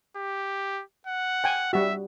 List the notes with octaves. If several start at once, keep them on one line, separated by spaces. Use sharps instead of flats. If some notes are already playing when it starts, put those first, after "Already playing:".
G4
F#5
G5 G#5
G3 F#4 E5